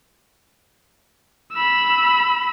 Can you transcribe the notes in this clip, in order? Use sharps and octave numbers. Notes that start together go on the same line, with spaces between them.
B5 E6